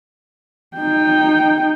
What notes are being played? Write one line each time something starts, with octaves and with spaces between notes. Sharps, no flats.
D#4 G5